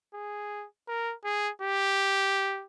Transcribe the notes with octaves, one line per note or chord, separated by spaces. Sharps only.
G#4
A#4
G#4
G4